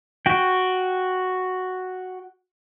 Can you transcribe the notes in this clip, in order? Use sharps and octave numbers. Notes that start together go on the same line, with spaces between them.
F#4 G5